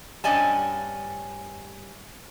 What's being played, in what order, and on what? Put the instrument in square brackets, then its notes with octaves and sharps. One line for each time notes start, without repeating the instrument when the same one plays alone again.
[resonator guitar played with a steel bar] G2 C#4 D5 D#5 G#5 A5